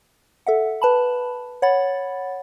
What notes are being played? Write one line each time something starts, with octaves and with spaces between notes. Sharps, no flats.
A4 E5 F#5
B4 A5 B5
C#5 F#5 B5 A6